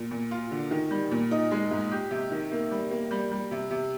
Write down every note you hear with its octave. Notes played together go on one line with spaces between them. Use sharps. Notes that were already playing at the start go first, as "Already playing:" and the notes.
Already playing: A#2
A#2
F4
D3
D#3
G3
A#2
D#4
G#3
G#2
G4
C3
D#3
A#3
G3
A#3
G3
G3
C3
C3